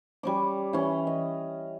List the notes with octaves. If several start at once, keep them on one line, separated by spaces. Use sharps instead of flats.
G3 C#4 D6
E3 C#4
D#5